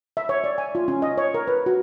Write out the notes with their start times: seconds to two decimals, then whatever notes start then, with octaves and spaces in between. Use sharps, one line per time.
0.17 E5
0.29 C#5
0.44 D5
0.58 G#5
0.75 F4
0.88 C#4
1.02 D#5
1.18 C#5
1.34 A#4
1.48 B4
1.66 F#4